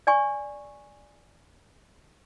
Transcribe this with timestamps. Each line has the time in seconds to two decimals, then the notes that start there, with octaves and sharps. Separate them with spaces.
0.07 D5 G#5 C#6